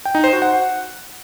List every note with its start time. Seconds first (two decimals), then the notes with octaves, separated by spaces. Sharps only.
0.05 G5
0.15 D#4
0.24 C5
0.33 F#4
0.42 F#5